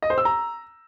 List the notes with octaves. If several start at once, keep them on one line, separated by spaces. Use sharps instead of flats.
D#5
C5
E6
A#5